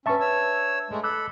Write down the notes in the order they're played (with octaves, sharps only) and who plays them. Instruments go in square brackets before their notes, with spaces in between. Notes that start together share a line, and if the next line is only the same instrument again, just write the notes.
[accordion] C#4 [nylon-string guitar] D4 B4 [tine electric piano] E5 A5 C#6
[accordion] C#5 E6
G#3 A3
[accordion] A4 B5 [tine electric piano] D6 E6 F#6